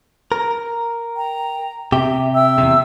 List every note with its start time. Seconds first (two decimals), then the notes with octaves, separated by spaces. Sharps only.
0.32 A#4
1.16 G5 A#5
1.92 C3 G4 E5
2.33 E5 G5 E6
2.58 E2 G2 C3